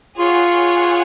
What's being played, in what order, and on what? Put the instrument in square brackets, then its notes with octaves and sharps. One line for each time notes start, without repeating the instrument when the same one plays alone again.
[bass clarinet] F4 [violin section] G#4 C#5 F#5